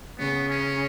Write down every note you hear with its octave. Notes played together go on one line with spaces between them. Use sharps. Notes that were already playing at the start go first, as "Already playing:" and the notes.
C#3 B3
C#4